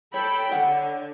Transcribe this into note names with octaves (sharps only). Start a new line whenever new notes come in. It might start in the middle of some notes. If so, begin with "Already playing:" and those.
A4 C#5 G5 B5
D3 C#5 F#5